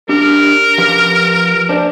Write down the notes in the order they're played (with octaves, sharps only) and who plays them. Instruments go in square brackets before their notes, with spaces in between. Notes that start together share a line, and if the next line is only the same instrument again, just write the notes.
[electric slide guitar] D4 G4 [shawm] A#4
[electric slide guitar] F3 G4 B4
D4 C5 D5